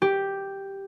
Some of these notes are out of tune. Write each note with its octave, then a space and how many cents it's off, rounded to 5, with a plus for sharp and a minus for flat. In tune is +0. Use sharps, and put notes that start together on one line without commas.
G4 +0